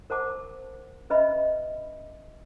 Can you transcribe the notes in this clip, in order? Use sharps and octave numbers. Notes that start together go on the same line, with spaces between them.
A#4 C5 F#5 A5 D6
C#4 B4 D#5 E5 B5